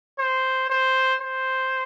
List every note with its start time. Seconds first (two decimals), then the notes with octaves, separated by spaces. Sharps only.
0.18 C5
0.69 C5
1.21 C5